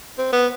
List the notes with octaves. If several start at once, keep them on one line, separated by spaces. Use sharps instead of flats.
C4
B3